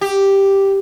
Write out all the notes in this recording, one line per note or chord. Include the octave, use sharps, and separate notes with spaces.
G4